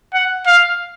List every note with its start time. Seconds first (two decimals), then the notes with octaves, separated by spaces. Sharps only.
0.14 F#5
0.46 F5